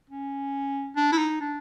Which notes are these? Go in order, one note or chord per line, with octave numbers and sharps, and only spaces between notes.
C#4
D4
E4
D#4
D4